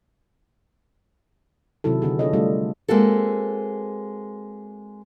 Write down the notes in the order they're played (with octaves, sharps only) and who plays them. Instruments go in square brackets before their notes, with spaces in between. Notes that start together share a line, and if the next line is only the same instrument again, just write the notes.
[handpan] C3 D#3 F#3 E4 A4
D3 B3 G#4
D4 F4 G#4 A4 C#5 D#5
G3 A3 D4 F4
[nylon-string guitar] G#3 A#3 C4 F#4 A4